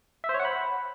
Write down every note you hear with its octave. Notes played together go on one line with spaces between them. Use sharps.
E5
C5
C#5
F#5
B5